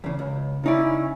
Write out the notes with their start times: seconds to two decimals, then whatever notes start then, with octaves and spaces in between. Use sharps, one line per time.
0.04 E2 C#3
0.19 C#2
0.64 C#3 C#4 D#4 E4 D5